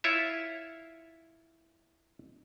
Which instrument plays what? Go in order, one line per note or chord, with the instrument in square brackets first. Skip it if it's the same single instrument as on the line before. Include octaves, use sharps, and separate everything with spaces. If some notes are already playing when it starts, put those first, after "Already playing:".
[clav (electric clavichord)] E4 F4 C#5 E5